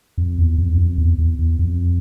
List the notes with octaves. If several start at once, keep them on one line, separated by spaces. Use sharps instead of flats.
F2
E2
F2
E2
F2
E2
E2
E2
F2